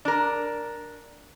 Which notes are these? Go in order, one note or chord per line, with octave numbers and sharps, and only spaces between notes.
D4 A#4